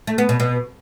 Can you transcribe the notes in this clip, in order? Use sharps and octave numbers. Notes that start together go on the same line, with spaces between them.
A3
B3
B2
B2